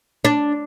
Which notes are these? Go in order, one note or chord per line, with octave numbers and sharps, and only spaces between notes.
D4